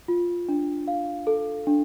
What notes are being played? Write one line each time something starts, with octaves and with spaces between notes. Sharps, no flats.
F4
D4
F5
A4
D4